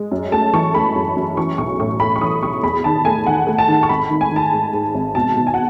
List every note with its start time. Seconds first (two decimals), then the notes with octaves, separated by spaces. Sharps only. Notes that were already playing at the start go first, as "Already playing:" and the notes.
Already playing: G#3
0.11 F#2
0.32 A3 A5
0.53 E3 C#6
0.74 A3 B5
0.95 F#2
1.17 F#2
1.37 E3 C#6
1.58 B1 C#6
1.79 A2 C#6
2.00 A2 B5
2.16 C#6
2.21 E3 D#6
2.43 B1 C#6
2.63 E2 B5
2.84 D#3 A5
3.05 A3 G#5
3.26 D#3 F#5
3.47 A3
3.58 A5
3.68 D#3
3.83 C#6
3.89 G#1 B5
4.10 D#3
4.21 G#5
4.31 D#3 A5
4.52 G#2
4.73 G#2
4.95 G#1
5.15 B2 A5
5.37 B2
5.47 G#5
5.54 F#5